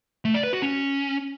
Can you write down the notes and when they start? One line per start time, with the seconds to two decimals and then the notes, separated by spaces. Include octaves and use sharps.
0.25 A3
0.34 D5
0.43 B4
0.53 F#4
0.62 C#4